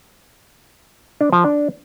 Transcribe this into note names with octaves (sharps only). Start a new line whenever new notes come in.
D4
F3
D4